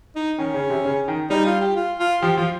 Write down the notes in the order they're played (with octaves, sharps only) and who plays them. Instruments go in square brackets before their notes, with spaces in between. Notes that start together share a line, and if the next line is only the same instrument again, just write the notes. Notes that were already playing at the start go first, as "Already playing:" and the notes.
[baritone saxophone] D#4
[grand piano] D#3 [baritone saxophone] C#4
[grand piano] C#3
C3
C#3
D#3
[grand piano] G3 [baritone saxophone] D#4
[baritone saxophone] F4
G4
F4
F4
[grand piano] F3 [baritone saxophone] G4
[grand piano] F3 [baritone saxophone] F4